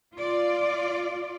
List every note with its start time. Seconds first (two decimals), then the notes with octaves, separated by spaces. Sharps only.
0.14 F4 D5